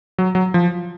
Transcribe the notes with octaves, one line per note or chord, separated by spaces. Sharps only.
F#3
F#3
F3